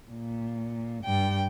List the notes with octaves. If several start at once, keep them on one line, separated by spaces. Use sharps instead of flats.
A#2
G2 G5